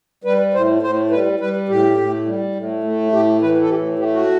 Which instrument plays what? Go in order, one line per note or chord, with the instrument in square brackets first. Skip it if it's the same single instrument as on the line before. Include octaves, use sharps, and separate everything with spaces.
[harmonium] G3 B4
A2 C5
A2 C5
G3 B4
G3 B4
A2 G4
A2
G3
A2
A3
A2 G4
E3 B4
A4
A2 G4
A3 G4
F#4